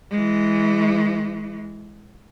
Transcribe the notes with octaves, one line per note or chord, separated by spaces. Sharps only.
E3 G#3